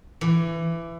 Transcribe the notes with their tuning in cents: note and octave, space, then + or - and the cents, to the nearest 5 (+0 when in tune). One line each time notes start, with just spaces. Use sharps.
E3 +20